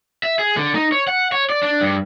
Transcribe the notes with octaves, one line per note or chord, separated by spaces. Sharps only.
E5
G#4
D3
D#4
C#5
F#5
C#5
D5
D4
G2